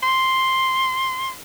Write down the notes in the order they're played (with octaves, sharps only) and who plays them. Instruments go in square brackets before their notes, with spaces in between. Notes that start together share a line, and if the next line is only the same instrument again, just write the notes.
[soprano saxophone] C6